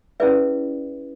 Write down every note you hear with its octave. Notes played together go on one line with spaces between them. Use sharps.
C#4 E4 G#4 B4 D5 E5